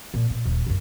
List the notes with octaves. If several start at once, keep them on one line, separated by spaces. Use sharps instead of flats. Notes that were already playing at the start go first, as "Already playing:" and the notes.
A#2
A#2
D#1
F#2 C#3